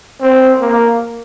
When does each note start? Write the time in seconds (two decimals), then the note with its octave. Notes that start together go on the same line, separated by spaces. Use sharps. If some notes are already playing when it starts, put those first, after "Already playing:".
0.21 C4
0.60 A#3